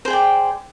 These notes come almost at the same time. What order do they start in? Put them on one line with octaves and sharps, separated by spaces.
C5 G#4 G5 D5